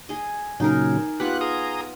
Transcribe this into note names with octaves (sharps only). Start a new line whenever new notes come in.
G#4 D#5
A#2 C#3 F#3 D#4 G#4 A#4
B3 F4 G4 F#6
G#4 A#5 D#6